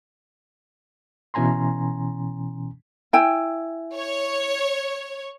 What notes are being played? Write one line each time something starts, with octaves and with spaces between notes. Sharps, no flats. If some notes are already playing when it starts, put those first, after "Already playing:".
B2 E3 C#4 G#5 A#5 C6
E4 G5 G#5
C#5